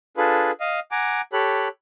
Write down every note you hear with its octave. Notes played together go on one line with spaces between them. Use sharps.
D4 F4 G#4 A4 B4
D#5 F5
F#5 G#5 A#5 D6
G4 A4 C#5 B5 F#6